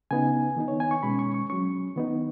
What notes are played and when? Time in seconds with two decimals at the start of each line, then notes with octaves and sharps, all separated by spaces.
0.11 C#3 B3 D#4 G#5
0.57 D#3 B3 D#4
0.68 C#5
0.80 G#5
0.91 C#6
1.03 B2 G#3 C#4 B5
1.19 C#6
1.34 C#6
1.50 F#3 C#4 C#6
1.96 D#3 B3 D#4